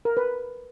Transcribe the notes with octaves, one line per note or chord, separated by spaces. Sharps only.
A#4
B4